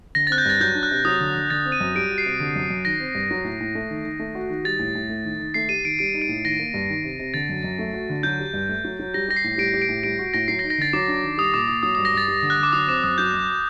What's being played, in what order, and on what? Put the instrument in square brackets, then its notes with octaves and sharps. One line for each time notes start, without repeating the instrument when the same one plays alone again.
[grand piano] D3 [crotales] A#6
[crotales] A6
[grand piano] C4 [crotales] F#6
[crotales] G6
[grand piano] G2 [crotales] A6
[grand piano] F#3 [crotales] G6
[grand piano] D4
[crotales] F#6
[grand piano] C3
[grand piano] F#3 [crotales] D#6
[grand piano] D3
D3
[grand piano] D3 [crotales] A6
[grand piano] C4
[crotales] D#7
[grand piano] F#2
[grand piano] G3 [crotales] D7
[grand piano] F#4
[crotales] C7
[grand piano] C3
D3
F#2
F#2
[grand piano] D#3 [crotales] A#6
[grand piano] C4
G2
F#3
A2
A2
A3
D#3
D#3
A3
F#4
D#3
[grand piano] G3 [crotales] A6
[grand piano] A2
A2
A3
D#3
D#3
[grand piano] A3 [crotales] C7
[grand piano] G4 [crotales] D#7
[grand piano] D#3 [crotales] D7
[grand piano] G3 [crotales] D7
[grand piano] D#4
[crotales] D7
[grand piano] A2
[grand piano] D#3 [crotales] A#6
[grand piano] A#3
G2
D#3
C3
C3
[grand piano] D3 [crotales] A6
[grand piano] F#2
F#2
A3
F#4
D3
[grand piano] F#3 [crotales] G6
[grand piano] G4
G2
A3
F#3
F#3
[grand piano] G3 [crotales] A#6
[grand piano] G4 [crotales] A#6
[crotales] C7
[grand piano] A2
[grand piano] G3 [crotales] D7
[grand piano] G4
[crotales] D7
[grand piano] A2
[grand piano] G3 [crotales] D7
[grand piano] F#4
[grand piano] A2 [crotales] A#6
[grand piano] F#3 [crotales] C7
[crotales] A#6
[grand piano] D#4
[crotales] A#6
[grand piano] D3 [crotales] A6
[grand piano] F#3 [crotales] D6
[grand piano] D4
D#3
[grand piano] G3 [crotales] D#6
[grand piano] A#2 [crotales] D6
[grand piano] A#2 [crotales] D#6
[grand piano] F#3 [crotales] D#6
[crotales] D#6
[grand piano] G2
[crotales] A#6
[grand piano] G2 [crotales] A6
[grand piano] G3
D3
[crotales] F#6
[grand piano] D3
[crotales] D6
[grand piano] F#3 [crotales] D#6
[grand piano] C4 [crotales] D6
[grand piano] F#2 [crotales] D#6
[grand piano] F#3 [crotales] G6
[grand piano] F#2